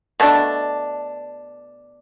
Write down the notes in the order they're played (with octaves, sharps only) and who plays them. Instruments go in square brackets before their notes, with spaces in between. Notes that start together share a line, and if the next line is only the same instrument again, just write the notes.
[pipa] B2 A3 D4